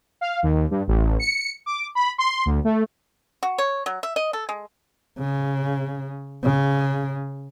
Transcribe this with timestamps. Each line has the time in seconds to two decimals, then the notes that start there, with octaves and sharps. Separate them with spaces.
0.21 F5
0.43 D#2
0.71 G2
0.88 A1
1.20 C#7
1.66 D6
1.95 B5
2.18 C6
2.46 D2
2.64 A3
3.43 F#4
3.58 C#5
3.86 F#3
4.03 E5
4.16 D#5
4.33 A4
4.49 G#3
5.19 C#3
6.43 C#3